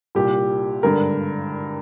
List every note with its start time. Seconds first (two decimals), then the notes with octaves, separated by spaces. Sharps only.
0.15 C2 A#2 G4
0.83 G#1 G2 D3 A#4